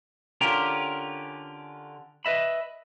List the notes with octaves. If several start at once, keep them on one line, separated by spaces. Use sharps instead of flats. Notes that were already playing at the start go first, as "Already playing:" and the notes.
D3 C#4 F4 G4 A#4
B4 D#5 E5 B5